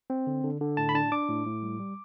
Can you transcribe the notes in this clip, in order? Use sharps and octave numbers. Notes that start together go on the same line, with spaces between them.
C4
D3
D3
D3
A2 A5
B5
D4 A5
D4 D6
A2
A2
G3
G3